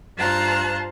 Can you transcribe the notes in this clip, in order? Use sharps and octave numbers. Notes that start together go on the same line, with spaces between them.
G2 F4 C5 A5 A#5 F#6